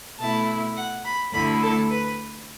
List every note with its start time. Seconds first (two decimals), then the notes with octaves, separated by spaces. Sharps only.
0.19 B2 A3 E4 A5
0.76 F#5
1.04 B5
1.33 D2 D3 A3 E4 B5
1.62 A4
1.90 B4